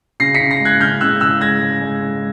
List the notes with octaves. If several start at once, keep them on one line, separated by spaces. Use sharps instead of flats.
C#3 A#6 C7
B6 C#7
C#3
A#6 C7
G#3
F#6 G#6
C#3 F6 G6
C#3 E6 F#6
C#3 E6 F#6
G#3 G#6 A#6
G#3
G#3
G#3